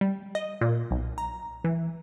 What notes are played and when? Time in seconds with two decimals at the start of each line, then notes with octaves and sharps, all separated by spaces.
0.01 G3
0.35 D#5
0.61 A#2
0.91 B1
1.18 A#5
1.64 E3